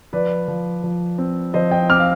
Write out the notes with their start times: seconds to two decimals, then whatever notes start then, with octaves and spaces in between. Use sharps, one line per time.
0.13 F3 B4 D5
0.48 F3
0.83 F3
1.18 C4
1.54 F3 C5 D#5
1.71 D#5 G5
1.89 C4 D6 F6
2.00 F5